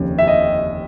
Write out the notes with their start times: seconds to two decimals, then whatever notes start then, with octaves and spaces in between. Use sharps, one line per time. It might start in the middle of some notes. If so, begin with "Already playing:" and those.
Already playing: F1 D#2 C#3
0.19 E5
0.28 D#5